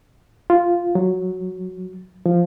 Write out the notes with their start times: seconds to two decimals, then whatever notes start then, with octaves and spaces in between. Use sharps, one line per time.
0.50 F4
0.95 F#3
2.26 F3